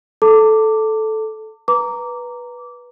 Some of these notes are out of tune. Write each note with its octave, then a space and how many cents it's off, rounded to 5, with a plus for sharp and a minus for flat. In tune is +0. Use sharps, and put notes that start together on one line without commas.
A4 -10 A5 +45 D6 +0
B4 -15 A#5 -10 D6 -15